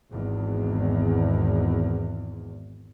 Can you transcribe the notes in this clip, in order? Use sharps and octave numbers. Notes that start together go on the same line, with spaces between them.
G#1 E2